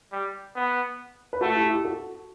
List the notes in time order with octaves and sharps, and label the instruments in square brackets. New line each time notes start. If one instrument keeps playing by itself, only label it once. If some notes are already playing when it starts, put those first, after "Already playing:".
[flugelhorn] G3
B3
[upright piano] B4
[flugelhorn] A3 [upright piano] F#4 A4
[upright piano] E4 G4
E4 G4
F#4 A4